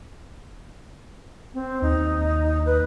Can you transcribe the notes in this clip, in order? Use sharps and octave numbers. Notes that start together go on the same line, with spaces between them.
C4
D#2 D#4
B4